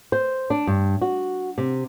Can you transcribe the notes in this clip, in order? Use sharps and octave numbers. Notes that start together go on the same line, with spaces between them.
C5
D4
G2
F#4
C3